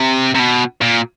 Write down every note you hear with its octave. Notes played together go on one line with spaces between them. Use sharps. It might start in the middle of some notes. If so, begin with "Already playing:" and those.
Already playing: C3
C3
B2
A#2